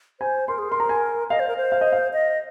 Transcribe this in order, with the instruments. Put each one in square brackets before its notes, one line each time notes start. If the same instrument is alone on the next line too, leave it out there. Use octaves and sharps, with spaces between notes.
[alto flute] C5 [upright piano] G#5
[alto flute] A#4 [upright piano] C6
[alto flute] G#4
[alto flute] A#4 [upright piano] C6
[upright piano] A#5
G#5
[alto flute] D#5 [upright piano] F5
[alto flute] C5
A#4
C5
[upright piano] F5
D#5
F5
[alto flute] D#5